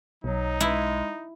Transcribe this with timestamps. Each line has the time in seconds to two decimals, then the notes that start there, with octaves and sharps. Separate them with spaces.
0.24 B1 F#3 D#4
0.60 G#3 E4